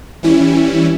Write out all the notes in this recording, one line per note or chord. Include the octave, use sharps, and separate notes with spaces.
E3 G3 C#4 E4